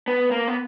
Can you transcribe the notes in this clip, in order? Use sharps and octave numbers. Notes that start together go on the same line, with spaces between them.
B3
A#3
B3